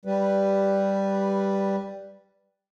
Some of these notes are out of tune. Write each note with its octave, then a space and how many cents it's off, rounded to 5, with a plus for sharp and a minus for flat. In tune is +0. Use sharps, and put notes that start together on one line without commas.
G3 +0 B4 +0